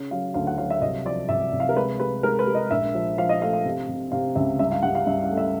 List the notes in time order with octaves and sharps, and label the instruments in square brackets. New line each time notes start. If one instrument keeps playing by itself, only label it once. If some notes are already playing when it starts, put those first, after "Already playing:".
Already playing: [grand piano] C#3
[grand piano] F#3 [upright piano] F5
[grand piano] D2 [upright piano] F5
[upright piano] F#5
[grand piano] F#3 [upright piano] F5
[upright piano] E5
[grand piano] C2 [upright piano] D#5
[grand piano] F3 [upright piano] D5
[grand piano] C2 [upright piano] E5
[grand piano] C2
[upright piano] F5
A#4
[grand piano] G#3 [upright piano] B4
[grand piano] G#3 [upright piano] B4
[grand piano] G#3 [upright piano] A#4
[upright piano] B4
[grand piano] G#3
[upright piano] D#5
[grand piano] A#1 [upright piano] E5
[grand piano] F3
[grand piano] F3 [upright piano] F5
[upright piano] D#5
[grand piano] A3 [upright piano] F5
[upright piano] F5
[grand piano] C3
C3
[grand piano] C3 [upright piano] F5
[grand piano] C#2 [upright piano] E5
[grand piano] G2 [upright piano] E5
[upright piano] F5
[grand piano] G2 [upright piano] F#5
[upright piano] F5
[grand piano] G2 [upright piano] E5
[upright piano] F5
[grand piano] A3
[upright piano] E5